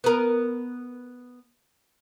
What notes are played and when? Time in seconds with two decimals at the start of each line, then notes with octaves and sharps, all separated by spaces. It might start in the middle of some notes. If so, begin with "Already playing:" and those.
0.04 B3 A#4